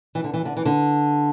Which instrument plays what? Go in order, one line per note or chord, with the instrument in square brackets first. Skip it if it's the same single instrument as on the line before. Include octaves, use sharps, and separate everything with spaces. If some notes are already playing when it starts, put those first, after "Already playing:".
[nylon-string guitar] E3
D3
E3
D3
E3
D3